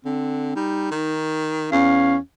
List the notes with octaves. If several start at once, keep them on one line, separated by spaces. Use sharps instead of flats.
D3 C4
G3 D#4
D#3
E2 C#4 F5